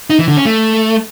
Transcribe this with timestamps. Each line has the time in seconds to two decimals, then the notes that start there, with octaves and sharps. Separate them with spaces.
0.10 D#4
0.19 E3
0.28 D3
0.37 C#4
0.46 A3